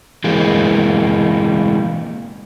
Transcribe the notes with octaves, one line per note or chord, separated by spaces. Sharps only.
E3 G#3 A#3 C4